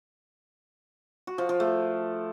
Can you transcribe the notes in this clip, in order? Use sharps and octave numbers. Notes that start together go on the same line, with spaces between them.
F#4
F3
F3
A3